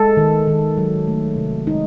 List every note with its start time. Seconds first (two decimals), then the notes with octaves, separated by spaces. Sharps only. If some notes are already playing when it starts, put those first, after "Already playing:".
Already playing: G#3 A4
0.17 D#3
0.48 D#3
0.78 F#3
1.07 A3
1.36 C3
1.67 G#3 D#4